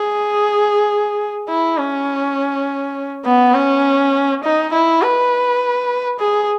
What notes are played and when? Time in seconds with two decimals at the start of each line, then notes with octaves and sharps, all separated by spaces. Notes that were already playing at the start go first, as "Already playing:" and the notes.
Already playing: G#4
1.49 E4
1.78 C#4
3.25 B3
3.55 C#4
4.44 D#4
4.73 E4
5.02 B4
6.20 G#4